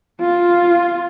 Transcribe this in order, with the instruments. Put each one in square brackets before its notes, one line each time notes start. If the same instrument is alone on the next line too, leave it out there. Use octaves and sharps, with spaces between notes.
[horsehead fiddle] F4